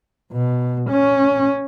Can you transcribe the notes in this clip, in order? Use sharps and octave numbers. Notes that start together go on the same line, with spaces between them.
B2
C#4